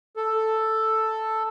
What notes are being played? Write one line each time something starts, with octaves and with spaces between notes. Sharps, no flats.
A4